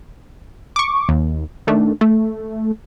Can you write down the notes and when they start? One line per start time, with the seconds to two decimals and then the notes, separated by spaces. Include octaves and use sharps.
0.76 C#6 D6
1.09 D#2
1.67 D#3 A3 D4
2.01 A3